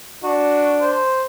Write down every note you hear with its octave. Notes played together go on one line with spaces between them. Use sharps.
D4 F#4
C5